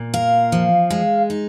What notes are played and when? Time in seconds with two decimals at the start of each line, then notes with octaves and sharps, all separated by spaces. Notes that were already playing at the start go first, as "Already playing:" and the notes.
Already playing: A#2
0.14 A#4 F5
0.52 F3
0.91 G#3
1.30 D#4